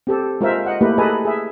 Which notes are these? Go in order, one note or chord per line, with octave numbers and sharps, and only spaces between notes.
C4 G4 A4
G#3 F4 A#4 C5 E5
D#5 F#5
A3 A#3 E4 G4 B4
G#4 A4 B4 D#5 G#5 A#5
G#4 E5